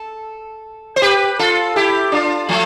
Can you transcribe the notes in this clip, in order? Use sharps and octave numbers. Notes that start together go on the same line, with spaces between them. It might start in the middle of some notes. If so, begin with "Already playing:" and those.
Already playing: A4
C5
G4 B4
F4 A4
E4 G4
D4 F4
F3 A3